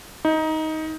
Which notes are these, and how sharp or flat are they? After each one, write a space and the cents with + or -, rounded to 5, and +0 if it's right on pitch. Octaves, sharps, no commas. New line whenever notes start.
D#4 +15